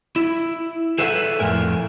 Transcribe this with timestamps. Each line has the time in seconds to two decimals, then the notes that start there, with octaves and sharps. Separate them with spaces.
0.16 E4
0.99 G#4 A4 B4 E5 F#5
1.39 F2 A2 A#4 G#5